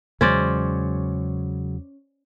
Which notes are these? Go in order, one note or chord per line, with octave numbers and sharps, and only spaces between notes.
E2 C#3 F#3 G#3 C#4 C5 D5